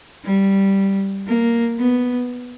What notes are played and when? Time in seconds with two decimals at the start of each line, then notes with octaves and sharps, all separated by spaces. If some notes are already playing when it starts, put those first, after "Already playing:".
0.25 G3
1.27 A#3
1.79 B3